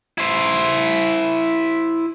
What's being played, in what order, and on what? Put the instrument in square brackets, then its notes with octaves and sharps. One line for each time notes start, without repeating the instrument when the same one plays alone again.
[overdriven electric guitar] E4 C5